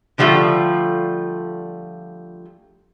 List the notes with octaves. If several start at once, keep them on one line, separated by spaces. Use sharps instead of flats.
D3 F3 G3 A3 F4